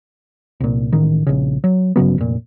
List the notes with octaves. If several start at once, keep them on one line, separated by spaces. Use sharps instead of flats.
C2 A#2
A1 D#3
A#1 C#3
F#3
G1 C#3 F#3 B3
F1 A#2